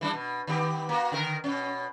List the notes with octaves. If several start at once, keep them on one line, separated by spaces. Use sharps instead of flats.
E3 G3 D4
B2
D#3 B3 G4
A#3 F#4
D3 D#3 A#4
B2 C#4